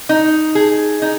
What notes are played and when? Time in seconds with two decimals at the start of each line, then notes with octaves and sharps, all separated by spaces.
0.09 D#4
0.55 G#4
1.02 D#4